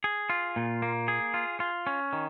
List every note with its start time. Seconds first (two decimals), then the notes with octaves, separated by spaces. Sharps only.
0.04 G#4
0.30 F4
0.56 A#2
0.82 A#3
1.08 G#4
1.34 F4
1.60 F4
1.87 C#4
2.13 D#3